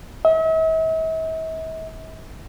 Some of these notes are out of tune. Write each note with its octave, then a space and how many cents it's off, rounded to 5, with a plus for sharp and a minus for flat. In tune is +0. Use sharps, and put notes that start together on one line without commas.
E5 -45